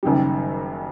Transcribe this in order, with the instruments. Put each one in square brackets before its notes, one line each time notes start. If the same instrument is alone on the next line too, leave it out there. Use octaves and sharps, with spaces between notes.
[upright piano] F#1 F#2 D#3 G3